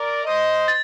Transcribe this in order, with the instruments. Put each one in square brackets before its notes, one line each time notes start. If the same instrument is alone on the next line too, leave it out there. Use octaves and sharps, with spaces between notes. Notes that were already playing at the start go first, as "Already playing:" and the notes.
Already playing: [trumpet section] A#4 D5
C5 D#5
[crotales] A6